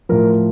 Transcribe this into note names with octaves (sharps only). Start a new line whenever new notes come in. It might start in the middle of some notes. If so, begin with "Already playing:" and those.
A2 F3 A#4